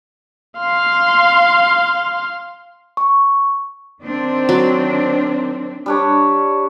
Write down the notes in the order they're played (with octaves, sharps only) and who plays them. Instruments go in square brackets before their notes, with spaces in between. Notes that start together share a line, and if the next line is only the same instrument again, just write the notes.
[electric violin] F5 C6
[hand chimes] C#6
[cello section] D#3 C4 D4
[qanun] F#3
[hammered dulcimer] G3 D4 C#5